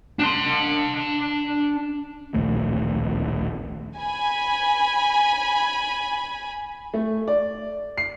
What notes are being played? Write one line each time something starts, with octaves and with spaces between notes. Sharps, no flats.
D4 C6
D1 A#1 D#2 A3
G#5 B5
A3
D5
C7